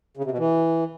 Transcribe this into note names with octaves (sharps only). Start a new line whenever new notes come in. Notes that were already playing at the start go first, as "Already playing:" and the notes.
C#3
C3
B2
E3